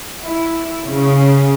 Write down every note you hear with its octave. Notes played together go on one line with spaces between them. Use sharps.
E4
C#3